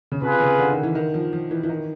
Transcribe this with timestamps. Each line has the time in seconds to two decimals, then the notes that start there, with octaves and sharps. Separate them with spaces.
0.12 C#3
0.21 C3 F4 G#4 B4
0.40 C#3
0.58 D3
0.71 D#3
0.83 E3
0.95 D#3
1.14 F3
1.33 F3
1.51 E3
1.63 E3
1.69 D#3